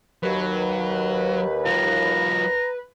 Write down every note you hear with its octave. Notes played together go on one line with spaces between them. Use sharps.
D#2 F#3 B4
F#3 F4 A#5